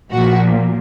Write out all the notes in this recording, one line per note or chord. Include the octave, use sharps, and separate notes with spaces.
A#2 F3 A#3 F#4